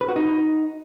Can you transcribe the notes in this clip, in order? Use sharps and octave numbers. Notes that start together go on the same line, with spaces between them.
B4
F#4
D#4